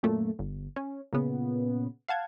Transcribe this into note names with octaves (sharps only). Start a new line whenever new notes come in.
F#2 A#2 A3
G1
C#4
A#2 C#3 B3
F5 F#5 A5 G#6